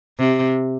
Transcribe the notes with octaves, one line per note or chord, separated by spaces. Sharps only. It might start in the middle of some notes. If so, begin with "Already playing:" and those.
C3